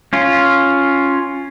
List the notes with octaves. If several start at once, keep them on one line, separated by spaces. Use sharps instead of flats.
C#4 F4